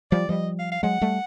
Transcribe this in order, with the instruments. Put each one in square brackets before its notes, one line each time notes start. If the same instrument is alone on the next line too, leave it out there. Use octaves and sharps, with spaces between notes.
[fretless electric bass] F3 G3 [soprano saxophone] D5
[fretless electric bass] F3 G3 [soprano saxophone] D#5
[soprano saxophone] F5
F5
[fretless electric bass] F#3 G#3 [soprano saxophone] F#5
[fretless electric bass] G3 A3